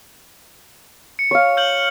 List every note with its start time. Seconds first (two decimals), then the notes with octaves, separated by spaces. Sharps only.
1.19 C#7
1.31 C#5 F5
1.57 F6 G6 F#7